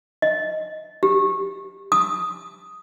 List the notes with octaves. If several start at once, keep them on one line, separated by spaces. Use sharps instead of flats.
D#5
G4
D#6